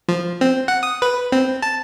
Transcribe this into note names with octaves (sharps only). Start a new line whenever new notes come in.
F3
C4
F#5
D#6
B4
C4
A5